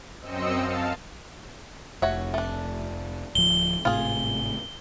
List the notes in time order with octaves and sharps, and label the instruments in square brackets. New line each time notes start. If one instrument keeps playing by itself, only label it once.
[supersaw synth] F#2 C4 D#5 E6 C#7
F5 A5
[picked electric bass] F1 [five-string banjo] F#4 C#5 E5
[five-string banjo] A3 D4
[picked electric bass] D1 F3 [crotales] G7
[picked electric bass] G#1 A2 C3 [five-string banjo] F4 G#4